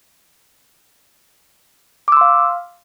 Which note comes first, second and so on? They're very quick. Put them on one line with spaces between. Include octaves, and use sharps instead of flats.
D6 E6 C6 F5